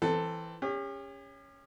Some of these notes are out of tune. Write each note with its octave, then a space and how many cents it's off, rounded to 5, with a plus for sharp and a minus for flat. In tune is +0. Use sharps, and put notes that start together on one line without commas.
E3 +10 C4 +0 A4 +15
C#4 +0 G4 +45